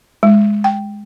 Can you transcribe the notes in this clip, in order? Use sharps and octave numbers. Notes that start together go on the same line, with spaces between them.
G#3
G5